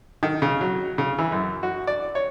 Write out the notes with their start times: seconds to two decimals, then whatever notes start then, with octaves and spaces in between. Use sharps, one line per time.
0.23 D#3
0.42 C#3
0.61 F#3
0.98 C#3
1.18 E3
1.32 F#2
1.63 F#4
1.87 D5
2.15 C#5